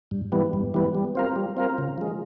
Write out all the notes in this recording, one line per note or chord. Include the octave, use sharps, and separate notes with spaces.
G2
E3 G3 B3
G2
E3 G3 B3
G3
C4 F4 A#4
G3
C4 F4 A#4
C#3
F3 G#3